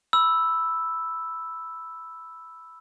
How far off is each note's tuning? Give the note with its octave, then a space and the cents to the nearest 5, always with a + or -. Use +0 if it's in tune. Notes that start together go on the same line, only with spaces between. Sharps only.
B5 +0 E6 +0